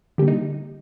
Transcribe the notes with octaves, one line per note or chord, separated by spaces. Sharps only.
D3 G3 A#3 G4
D#4